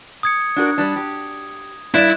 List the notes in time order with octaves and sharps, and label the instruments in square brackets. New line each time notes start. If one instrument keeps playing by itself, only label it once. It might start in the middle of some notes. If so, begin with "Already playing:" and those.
[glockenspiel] D#6 G#6 C#7
[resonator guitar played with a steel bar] D4 F#4 A#4
G3 D4
G4
[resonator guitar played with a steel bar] G2 D5 [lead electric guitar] E4 [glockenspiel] F#6 E7